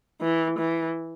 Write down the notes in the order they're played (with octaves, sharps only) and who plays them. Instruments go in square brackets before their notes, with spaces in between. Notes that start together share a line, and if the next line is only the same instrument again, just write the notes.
[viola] E3
E3